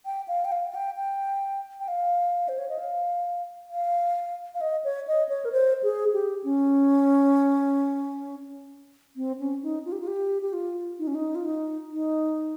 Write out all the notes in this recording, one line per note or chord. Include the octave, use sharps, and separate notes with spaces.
G5
F5
G5
F5
F5
G5
G5
G5
F5
C5
C#5
D#5
F5
F5
F5
D#5
C#5
D#5
C#5
A#4
C5
G#4
G4
C#4
C4
C#4
D#4
F4
G4
F4
G4
G4
F4
D#4
C#4
D#4
F4
D#4
D#4